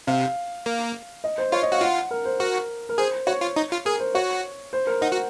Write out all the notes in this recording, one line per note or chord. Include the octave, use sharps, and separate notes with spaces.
C3 F5
A#3
D#5
C5
F4 C#5
D#5
F#4 F5
F4 F#5
A#4
C5
F#4 A#4
A#4
G#4 C5
F#4 C#5
F4
D#4
F4
G#4 A#4
C5
F#4 C#5
C5
A#4
D#4 F#5
F#4